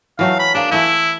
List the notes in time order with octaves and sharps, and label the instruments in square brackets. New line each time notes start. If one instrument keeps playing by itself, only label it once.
[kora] E3 F#3 A3 [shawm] F5
[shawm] B5
[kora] A#3 G#4 [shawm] D4
[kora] E3 A3 B4 [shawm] E4